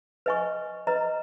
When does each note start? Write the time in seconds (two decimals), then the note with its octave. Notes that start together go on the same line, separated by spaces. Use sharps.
0.26 B4 D#5 G#5 C#6
0.87 B4 D#5 A#5